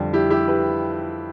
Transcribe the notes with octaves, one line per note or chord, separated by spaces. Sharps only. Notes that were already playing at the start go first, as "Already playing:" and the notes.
Already playing: F2 D3 G3
E4 G4
E4 G4
G4 B4